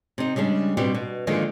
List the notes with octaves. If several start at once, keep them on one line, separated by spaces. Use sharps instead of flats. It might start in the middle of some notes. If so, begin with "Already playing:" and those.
C3 D#4
C#3 G3 G#3 D4
B2 G3 C4 G4
B2
D3 D#3 F3 G#3 A#3